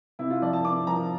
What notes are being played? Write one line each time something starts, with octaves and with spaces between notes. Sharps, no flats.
C3 E4
F4
F3 D5
A5
C3 D6
F3 A#5